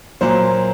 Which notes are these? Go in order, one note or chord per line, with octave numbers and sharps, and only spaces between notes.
A#2 F#3 A#3 C5